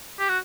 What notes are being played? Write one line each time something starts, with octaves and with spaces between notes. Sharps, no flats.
G4
F#4